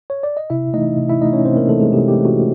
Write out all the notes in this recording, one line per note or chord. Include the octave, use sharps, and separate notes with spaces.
C#5
D5
D#5
C3 E4 E5
E3 A3 D#4 D#5
C3
E4 E5
E3 A3 D#4 D#5
C#4 C#5
C3 C4 C5
A#3 A#4
E3 A3 A4
G#3 G#4
C3 G4
G4
E3 A3
F#4